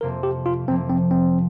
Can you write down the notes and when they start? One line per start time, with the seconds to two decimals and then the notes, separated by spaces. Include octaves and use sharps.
0.01 F2 C3 F3 A#3 A#4
0.23 G4
0.46 F4
0.68 F2 C3 F3 A#3 C4
0.90 C4
1.11 C4